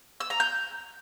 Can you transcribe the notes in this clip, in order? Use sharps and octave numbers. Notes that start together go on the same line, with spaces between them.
E6
A#5
G6